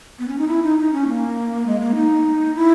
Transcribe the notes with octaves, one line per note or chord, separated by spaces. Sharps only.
B3
C#4
D#4
E4
D#4
D#4
C#4
A#3
G#3
A#3
D#4
E4